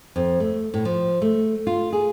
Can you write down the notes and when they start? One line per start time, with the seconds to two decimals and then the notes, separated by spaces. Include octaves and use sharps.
0.16 F2
0.40 A3
0.74 A2
0.85 F3
1.22 A3
1.67 F4
1.93 G#4